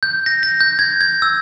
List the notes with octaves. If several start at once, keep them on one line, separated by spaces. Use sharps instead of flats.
G6
A#6
A#6
G6
G#6
G#6
E6